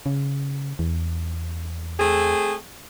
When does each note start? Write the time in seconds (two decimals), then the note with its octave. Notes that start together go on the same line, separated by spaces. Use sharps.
0.06 C#3
0.79 E2
1.99 A3 C4 G#4